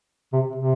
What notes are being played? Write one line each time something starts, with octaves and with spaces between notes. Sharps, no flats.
C3
C3